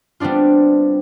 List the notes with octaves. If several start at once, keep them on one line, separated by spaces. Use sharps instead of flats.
G3 B3 C4 D4 F4